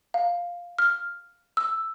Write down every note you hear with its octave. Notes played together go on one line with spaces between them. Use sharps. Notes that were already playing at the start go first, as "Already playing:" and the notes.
F5
F6
E6